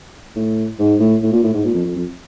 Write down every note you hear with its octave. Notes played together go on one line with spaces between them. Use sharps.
A2
G#2
A2
A2
A#2
A2
G#2
A#2
F2
F2
F2